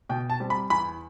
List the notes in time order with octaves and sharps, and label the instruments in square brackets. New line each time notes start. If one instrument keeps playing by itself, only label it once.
[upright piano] B2 G5
A5
G3 C4
B5
E2 B5